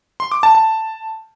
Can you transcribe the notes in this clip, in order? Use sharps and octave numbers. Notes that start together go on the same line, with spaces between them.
C6
D6
A5
A5